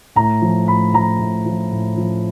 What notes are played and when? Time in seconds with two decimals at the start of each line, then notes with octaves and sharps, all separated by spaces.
0.16 A2 A#5
0.42 F3
0.68 A2 B5
0.93 F3 A#5
1.19 A2
1.46 F3
1.72 A2
1.97 F3